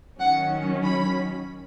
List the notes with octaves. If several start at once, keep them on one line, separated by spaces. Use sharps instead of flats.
D#3 F#3 C#4 F#5
B5